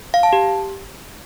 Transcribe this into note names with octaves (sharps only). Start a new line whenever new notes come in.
F5
A5
G4